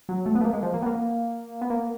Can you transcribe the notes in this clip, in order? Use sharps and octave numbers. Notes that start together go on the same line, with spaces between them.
F#3
A3
B3
A3
A#3
G#3
F3
A#3
B3
A#3
B3
A#3